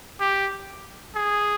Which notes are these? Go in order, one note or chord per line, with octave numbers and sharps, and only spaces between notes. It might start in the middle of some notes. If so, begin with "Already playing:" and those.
G4
G#4